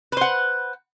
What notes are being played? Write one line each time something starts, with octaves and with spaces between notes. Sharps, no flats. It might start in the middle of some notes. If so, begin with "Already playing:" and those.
B4 C5 F#5